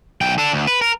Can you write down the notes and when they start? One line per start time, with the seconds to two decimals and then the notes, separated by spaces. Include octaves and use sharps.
0.21 B1 G5
0.38 D4 A4
0.53 D2
0.67 B4
0.82 A#4